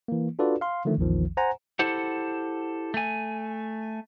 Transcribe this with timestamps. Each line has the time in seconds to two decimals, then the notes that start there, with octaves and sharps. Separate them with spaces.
0.08 E3 A#3
0.39 D4 F4 F#4 A4 B4 D5
0.61 F5 C6
0.85 D3 D#3 F3 A3
0.98 A#1 E2 D#3 F3
1.37 C5 F#5 G#5 A#5
1.79 E4 G4 A4 C5 F#5
2.94 A3 G#5